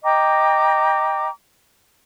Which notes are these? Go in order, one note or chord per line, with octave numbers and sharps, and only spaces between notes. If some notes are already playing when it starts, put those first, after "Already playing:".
D#5 G5 A#5 D6